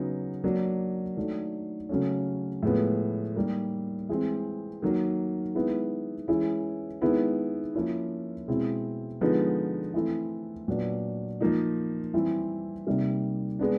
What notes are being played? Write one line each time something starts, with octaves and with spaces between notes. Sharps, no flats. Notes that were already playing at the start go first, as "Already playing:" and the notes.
Already playing: C#3 F#3 B3 D#4
F#3 A#3 D4
D#3 F#3 A3 D4
C#3 F#3 A3 C#4
A2 F3 G#3 B3
D#3 G3 A#3
E3 G#3 C4
D#3 F#3 A#3
D#3 G#3 B3 E4
E3 G#3 C#4 E4
D#3 G#3 B3 E4
F3 A#3 C#4 E4
B2 G#3 C4 E4
D3 F3 G#3 B3 D#4
E3 A3 C4 E4
A#2 F#3 B3 D4
F3 A#3 D#4
E3 G3 C4 E4
C3 D#3 G3 A#3
G#3 B3 D4